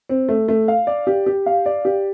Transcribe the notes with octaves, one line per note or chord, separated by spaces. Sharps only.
C4
A3
A3
F5
D5
G4
G4
F5
D5
G4